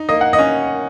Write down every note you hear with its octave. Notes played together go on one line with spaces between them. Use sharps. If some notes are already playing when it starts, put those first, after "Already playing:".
Already playing: D#4
A#3 D#5
F#5
D#5
C#4